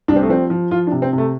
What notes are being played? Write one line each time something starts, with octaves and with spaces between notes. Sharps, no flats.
C2 D4
C4
A3
F3 C4
F3
F3 F4
D4
C3
C4
C3
A3